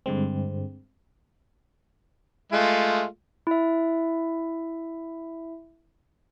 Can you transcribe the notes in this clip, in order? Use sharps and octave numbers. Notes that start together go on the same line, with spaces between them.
G2 D3 G#3 C4
G#3 A3 F4
E4 E5